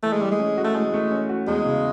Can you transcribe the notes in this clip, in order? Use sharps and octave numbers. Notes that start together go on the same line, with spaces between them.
E3 A3
G#3
G3 A3
G#3
C#4
F#4
A3
E3 G#3
A3
C#4
F#4
E2 G#3
C#3